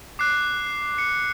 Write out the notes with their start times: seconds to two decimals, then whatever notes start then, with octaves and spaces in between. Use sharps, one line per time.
0.19 D6 F#6 C7
0.98 C#7